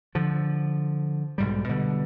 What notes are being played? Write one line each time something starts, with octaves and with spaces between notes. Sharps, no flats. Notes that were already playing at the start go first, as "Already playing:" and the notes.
D3 F3
B1 G#2 G3
B2 D3 G3